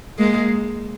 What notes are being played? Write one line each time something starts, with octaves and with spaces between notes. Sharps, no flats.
G#3 A#3